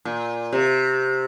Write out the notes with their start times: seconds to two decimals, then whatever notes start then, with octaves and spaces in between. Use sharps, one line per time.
0.05 A#2
0.53 C3